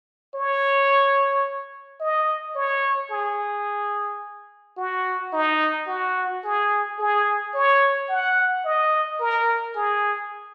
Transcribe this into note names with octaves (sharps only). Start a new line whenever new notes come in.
C#5
D#5
C#5
G#4
F#4
D#4
F#4
G#4
G#4
C#5
F#5
D#5
A#4
G#4